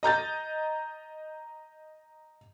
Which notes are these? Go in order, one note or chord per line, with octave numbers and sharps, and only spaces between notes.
D#5 A#5 G6 A6